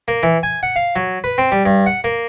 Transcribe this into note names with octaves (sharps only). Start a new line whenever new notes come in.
A#3
E3
G#5
F#5
F5
F#3
B4
C4
G3
G2
F#5
A#3